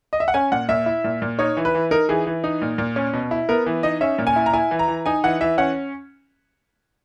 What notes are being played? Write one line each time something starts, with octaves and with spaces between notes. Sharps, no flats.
D#5
E5
F#5
C#4 G#5
A#2 F#5
A#2 E5
E4
A#2
A#2
D#4 C#5
E3
B4
E3
D#4 A#4
E3 G#4
E3
D#4
A#2
A#2
C#4
B2
E4
B3 A#4
E3
D#4 D#5
C#4 E5
A#2
G#5
E4
A#5
E4 G#5
E3
A#5
E3
D#4 G#5
E3 F#5
E3 E5
C#4 F#5